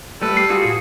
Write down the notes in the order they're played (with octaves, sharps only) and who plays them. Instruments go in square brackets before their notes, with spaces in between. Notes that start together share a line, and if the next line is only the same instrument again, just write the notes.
[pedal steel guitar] G3 B4 [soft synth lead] A3 [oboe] A4
[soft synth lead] G4 [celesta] C7
[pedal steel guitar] F4 F#4 G#4
[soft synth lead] A2